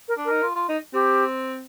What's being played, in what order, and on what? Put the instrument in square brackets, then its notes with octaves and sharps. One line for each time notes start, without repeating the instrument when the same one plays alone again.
[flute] A#4
[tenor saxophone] D4
[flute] A#4
[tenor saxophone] D#4
F4
F4
D#4
[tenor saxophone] C4 [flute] G4